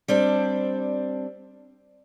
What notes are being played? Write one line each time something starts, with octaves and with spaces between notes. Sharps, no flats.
G3 C4 D4